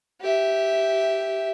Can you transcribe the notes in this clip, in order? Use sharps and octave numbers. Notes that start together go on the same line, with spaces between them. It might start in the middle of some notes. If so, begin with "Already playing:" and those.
G4 E5